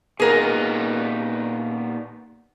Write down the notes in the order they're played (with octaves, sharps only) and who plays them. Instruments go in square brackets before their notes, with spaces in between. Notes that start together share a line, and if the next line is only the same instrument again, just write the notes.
[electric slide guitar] A#2 B3 D#4 [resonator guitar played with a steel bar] G#4 A#4